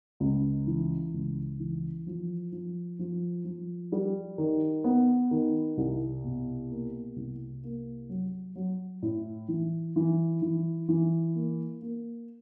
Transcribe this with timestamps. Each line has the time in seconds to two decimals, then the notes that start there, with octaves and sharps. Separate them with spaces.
0.20 C#2
0.67 E3
1.14 C#2
1.59 E3
2.07 F3
2.52 F3
2.99 F3
3.45 F3
3.92 G3
4.38 D#3
4.84 B3
5.31 D#3
5.77 C2
6.24 B2
6.70 A#3
7.16 C2
7.64 A#3
8.09 F#3
8.55 F#3
9.02 A2
9.48 E3
9.96 E3
10.42 E3
10.88 E3
11.35 A#3
11.82 A#3